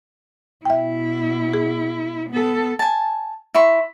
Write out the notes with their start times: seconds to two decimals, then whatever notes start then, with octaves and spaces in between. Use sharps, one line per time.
0.65 B2 E4 E5 G5
1.54 G#4
2.30 B3 A4
2.79 G#5 A5
3.54 E4 C6 C#6